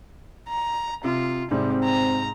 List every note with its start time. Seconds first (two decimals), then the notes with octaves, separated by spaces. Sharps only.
0.48 A#5
1.04 C3 F4
1.51 G#2 C3 G3 C4
1.84 A#5